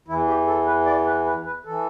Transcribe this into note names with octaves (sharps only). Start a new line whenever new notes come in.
E2 E3 E4
G4
A4
B4
D5
B4
B4
B4
E3 A4